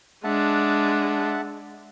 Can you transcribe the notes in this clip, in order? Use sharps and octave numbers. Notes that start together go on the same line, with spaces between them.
G#3 D4 E5 F#5 A5